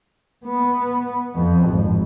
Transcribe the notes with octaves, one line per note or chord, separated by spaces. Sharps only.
B3
F2
G#1